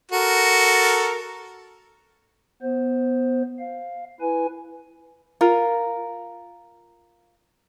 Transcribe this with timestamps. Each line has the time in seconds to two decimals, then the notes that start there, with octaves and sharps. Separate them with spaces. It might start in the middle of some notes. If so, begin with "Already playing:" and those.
0.12 F#4 A4 A#4
2.62 B3 C5
3.59 F5
4.21 E4 B4 G#5
5.41 F4 A#4